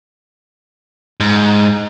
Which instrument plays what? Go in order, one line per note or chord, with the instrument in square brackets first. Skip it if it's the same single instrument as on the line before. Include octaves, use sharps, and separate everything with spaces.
[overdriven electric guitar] G#2